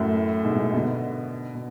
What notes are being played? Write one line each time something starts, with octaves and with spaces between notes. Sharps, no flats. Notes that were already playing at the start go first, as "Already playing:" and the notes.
Already playing: F#2 A2
G#2 B2
A2
G#2
B2 D3
B2